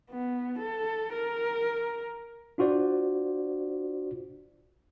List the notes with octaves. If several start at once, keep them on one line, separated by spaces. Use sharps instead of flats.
B3
A4
A#4
D4 F4 F#4 C5 D5